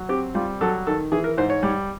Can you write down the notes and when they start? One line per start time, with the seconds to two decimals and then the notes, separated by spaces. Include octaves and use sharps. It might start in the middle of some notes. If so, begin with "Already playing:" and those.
Already playing: F#3
0.09 C4 G4
0.34 G3 F4
0.61 F#3 A4
0.87 D#3 A4
1.12 E3 G#4
1.24 A#4
1.37 G#2 C5
1.50 C#5
1.63 G3